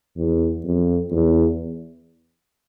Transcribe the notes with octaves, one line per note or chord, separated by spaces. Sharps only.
E2
F2
E2